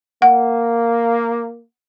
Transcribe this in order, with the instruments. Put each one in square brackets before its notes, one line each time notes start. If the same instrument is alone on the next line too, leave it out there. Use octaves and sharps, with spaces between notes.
[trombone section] A#3 [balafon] F#5